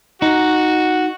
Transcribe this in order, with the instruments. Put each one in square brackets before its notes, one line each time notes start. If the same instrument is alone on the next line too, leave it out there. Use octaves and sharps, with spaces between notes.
[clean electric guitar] D#4 [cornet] F#4